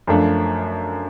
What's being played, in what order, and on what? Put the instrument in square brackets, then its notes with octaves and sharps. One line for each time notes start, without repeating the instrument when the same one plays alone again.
[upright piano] F#2 F3 A3 D4